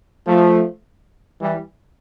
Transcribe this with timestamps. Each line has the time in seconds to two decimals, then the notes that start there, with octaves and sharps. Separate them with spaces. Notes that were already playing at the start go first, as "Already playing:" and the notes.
0.26 F3 A3
1.41 E3 G3